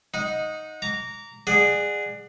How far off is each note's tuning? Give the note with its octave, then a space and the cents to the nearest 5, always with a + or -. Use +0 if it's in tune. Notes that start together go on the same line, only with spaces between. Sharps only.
D#4 +0 F#5 -25
A#5 -10 D6 -30
G#4 -10 D5 +30 F#5 +0